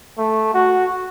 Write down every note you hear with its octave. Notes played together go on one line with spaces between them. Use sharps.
A3
F#4